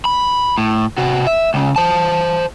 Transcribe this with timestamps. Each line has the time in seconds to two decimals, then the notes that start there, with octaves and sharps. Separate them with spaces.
0.05 B5
0.58 A2
0.98 C3 F#4
1.27 E5
1.54 C#2 C#3
1.76 C5 A5